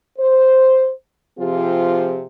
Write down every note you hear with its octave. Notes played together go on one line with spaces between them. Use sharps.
C5
C3 F3 C4 F4 G4 G#4